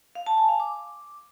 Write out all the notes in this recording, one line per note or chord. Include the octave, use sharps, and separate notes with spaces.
F5
A5
G#5
F5
D6